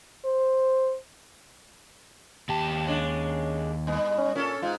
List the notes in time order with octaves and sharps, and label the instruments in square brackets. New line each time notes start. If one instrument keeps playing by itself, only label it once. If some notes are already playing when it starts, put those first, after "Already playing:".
[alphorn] C5
[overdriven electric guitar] D#2 A5 [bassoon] G4
[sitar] G#3 D4 [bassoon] C#4
[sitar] G2 B3
[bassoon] C#4
[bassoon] A#2 [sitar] C#4 A4
[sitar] G#2 [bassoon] F4